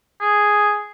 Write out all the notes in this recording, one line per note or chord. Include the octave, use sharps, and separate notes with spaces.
G#4